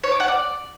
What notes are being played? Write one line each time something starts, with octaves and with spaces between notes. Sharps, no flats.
C#5
D6
F#5
D5